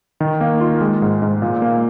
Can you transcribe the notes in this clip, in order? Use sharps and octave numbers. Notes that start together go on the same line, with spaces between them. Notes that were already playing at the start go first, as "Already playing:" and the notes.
D#3
A#3
F4
G#3
G#2
G#2
A#2
A#3